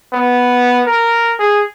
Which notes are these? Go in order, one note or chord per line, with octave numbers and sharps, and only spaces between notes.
B3
A#4
G#4